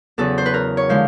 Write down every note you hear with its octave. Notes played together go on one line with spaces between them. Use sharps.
E2 C#3 F#3 A4
C5
B4
A#4
C#5
D3 F3 G#3 C5